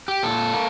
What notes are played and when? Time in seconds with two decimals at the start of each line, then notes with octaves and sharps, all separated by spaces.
0.08 G4
0.23 A#2 A4
0.54 A#3